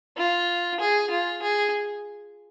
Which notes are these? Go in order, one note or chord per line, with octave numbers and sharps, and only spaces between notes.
F4
G#4
F4
G#4